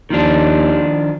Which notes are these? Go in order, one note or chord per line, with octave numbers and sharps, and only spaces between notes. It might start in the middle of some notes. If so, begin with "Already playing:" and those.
D#2 D#3 F3 D4